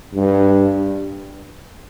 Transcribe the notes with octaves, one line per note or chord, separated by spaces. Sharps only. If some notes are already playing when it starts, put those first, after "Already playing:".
G2